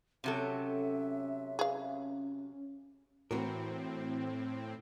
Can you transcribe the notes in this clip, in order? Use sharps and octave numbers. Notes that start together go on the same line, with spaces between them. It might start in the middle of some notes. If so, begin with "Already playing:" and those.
C3 F#3 C#4 A4 E5
G#4 F5
A2 E3 C4 F#4 A#4